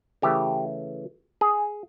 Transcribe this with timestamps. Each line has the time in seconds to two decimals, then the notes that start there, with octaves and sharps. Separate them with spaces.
0.22 C#3 E3 A3 G4
1.41 G#4